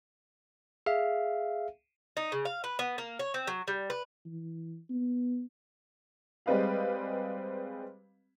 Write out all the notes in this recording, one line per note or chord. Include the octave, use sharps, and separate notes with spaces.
G#4 E5 F5
D#4
C#3
F5
B4
B3
A#3
C#5
C4
F#3
G3
B4
E3
B3
G3 G#3 C4 B4 D#5 F5